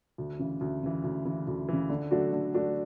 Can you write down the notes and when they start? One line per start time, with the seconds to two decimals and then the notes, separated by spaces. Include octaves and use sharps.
0.18 D2
0.39 C#3 E3
0.61 D2
0.83 C#3 E3
1.04 D2
1.25 C#3 E3
1.47 D2
1.69 C#3 E3
1.89 D3
2.11 F#3 A3 D4 F#4
2.33 D3
2.54 F#3 A3 D4 F#4